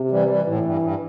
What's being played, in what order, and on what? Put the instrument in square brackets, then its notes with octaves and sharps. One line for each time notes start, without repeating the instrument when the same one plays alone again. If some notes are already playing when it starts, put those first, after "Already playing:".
Already playing: [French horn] C3
[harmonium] E3 G3
E3 G3
[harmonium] A2 [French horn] E3
[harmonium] G2
G2